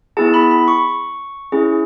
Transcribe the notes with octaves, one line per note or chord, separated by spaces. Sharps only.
B3 E4 G#4 A5
B5
B5
C#6
C#4 E4 G#4